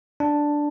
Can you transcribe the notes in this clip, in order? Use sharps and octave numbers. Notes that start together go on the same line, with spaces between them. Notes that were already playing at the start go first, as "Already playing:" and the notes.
D4